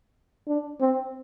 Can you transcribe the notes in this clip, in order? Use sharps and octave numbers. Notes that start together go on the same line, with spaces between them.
D4
C4